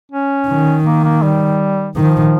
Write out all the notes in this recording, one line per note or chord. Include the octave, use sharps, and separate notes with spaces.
C#4
D#3
A#3
A#3
G3
D#3 F3